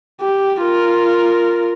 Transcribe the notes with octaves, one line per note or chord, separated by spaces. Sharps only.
G4
F4 A#4